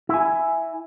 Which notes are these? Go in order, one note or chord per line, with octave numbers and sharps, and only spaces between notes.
E4 G#5